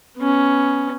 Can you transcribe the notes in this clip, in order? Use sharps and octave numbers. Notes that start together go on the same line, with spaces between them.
B3 C#4